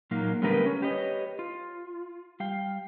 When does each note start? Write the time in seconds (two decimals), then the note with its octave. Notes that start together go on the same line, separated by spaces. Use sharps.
0.11 A#2 F#3 A#3 D#4
0.42 D3 G3 A3 B3 A#4 B4
0.66 C#4
0.82 G4 B4 C#5 D#5
1.39 F4
2.40 G3 F5 G5